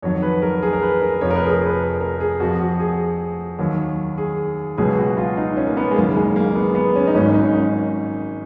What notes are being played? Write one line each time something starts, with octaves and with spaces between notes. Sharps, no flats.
F2 D#3 F#3 C#5
B4
A#4
G#4
A#4
B4
A#4
F1 F2 F3 C#5
A#4
B4
G#4
A#4
B4
A#4
G#4
F2 F3 F#4
F#4
G#4
D#2 D#3 F#3
G#4
C#2 B2 F#3 G#4
F#4
F4
D#4
C#4
A#3
B3
G#3
F#1 F#2 D#3 F#3 A#3
G#3
A#3
B3
B3
C#4
D#4
G#1 G#2 D#3 F#3 C#4
D#4
C#4